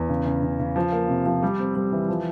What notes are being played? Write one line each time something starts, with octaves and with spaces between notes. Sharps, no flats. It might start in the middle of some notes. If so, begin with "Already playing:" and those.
Already playing: E2
C#3
C#3
C#3
C#3
F3
A#3
C3
F3
G3
C4
G3
E3
F3